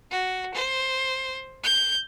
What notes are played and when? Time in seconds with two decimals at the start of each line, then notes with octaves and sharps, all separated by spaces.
0.11 F#4
0.54 C5
1.64 G6